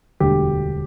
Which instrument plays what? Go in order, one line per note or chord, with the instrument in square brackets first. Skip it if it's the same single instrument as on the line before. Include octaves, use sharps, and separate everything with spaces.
[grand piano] E1 D2 D3 G3 G4